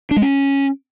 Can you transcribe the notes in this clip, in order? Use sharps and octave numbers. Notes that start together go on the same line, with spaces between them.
D4
G#3
C#4